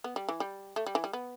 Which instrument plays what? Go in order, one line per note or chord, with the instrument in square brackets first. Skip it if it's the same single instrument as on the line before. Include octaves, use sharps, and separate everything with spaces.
[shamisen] B3
G3
E3
G3
A3
G3
E3
G3
B3